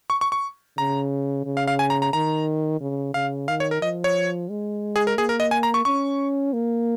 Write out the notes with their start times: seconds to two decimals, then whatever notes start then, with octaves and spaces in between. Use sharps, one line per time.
0.10 C#6
0.21 C#6
0.32 C#6
0.78 C#3 A#5
1.45 C#3
1.57 F5
1.68 F5
1.79 G#5
1.90 A#5
2.02 A#5
2.13 D#3 A#5
2.81 C#3
3.14 C#3 F5
3.48 D#3 F5
3.60 C#5
3.71 A#4
3.82 F3 D#5
4.04 C#5
4.50 G#3
4.96 G#4
5.07 A#4
5.18 A#3 G#4
5.29 A#4
5.40 D#5
5.51 G#5
5.63 A#5
5.74 C#6
5.85 C#4 C#6
6.53 A#3